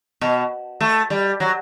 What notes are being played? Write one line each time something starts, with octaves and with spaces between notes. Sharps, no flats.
B2
A3
G3
F#3